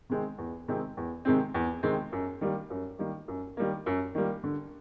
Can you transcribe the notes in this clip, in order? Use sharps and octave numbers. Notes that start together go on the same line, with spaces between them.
C3 D#3 G#3 C4
E2
C3 D#3 G#3 C4
E2
C3 D#3 G#3 C4
E2
C3 D#3 G#3 C4
F#2
D#3 G3 A#3
F#2
D#3 G3 A#3
F#2
D#3 G3 A#3
F#2
D#3 G3 A#3
D3